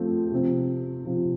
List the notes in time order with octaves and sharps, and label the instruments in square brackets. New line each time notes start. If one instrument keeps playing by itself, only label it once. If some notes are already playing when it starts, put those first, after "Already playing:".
Already playing: [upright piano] F3 A3 C4
C3 F3 C4
C3 F3 C4